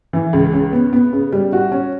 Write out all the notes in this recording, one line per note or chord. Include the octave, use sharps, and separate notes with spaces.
E3
C#2
C#3
B3
B3
C#3
G3
F#4
C#4